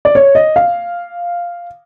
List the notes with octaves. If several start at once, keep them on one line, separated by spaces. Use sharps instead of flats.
D5
C#5
D#5
F5